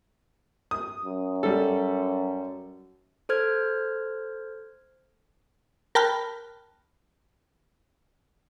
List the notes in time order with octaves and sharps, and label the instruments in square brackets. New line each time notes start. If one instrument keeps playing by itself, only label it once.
[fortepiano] D#6
[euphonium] F#2
[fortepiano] G3 A4
[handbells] A4 C5 F6 G#6
[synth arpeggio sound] A#4 G5 A5 B5 F6 F#6